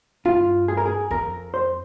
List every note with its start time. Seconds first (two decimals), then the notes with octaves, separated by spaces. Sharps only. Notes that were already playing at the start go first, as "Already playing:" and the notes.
0.25 G2 F4
0.68 G#4
0.77 A#4
0.85 G#4
1.11 F2 A#4
1.54 C5